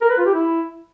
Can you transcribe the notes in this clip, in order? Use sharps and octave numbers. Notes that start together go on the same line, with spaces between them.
A#4
B4
F4
G4
E4